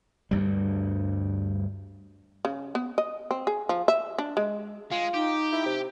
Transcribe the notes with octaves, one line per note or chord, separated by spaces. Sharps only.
D2 G2 G3
C#3
B3
D#5
C4
G#4
F3
E5
D4
G#3
G#3 F4
D#4 G4
E4
C3